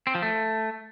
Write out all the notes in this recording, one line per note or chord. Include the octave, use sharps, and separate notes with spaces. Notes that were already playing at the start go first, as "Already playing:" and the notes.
C4
F3
A3